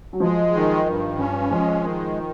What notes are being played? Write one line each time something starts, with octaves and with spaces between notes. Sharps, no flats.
F#3
F3 G#3
D#3
G2
C#4
F3 G#3
D#3